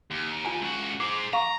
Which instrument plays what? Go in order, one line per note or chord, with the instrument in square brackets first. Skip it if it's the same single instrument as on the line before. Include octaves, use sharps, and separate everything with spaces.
[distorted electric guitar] D#2
[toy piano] F4 G#5 A5
[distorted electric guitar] C#2 F#4
[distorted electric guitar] G#4 C5 [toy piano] D6
[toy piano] F5 C#6 [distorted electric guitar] A#5